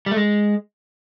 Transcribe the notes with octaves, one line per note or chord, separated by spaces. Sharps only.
G3
A3
G#3